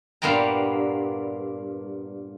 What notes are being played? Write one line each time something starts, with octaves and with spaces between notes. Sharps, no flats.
G2 A#2 A#3 B3 G5 A#5